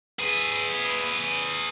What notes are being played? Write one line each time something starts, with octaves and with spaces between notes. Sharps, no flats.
G#4 B4